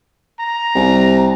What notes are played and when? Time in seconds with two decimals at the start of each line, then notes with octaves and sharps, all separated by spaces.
0.39 A#5
0.75 C2